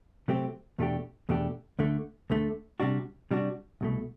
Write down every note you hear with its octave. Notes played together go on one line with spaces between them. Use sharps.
C3 F#3 A3 C4 G4
E2 B2 A3 D4 G4
E2 B2 A3 D4 G4
D2 D3 A3
D2 D3 A3
C3 G3 D4 F#4
C3 G3 D4 F#4
C2 B2 A3